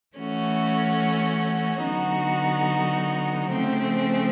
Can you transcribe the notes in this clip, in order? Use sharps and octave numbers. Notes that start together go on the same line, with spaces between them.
E3 A3 C#4 F#4
D3 F#3 B3 D#4 F#4
C#3 F3 A3 C4